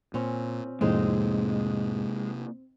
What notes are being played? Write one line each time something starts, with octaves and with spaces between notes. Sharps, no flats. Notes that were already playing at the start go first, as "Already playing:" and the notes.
A#2 C4 C#4
F2 A2 C3 G#3 A#3 C4 D#4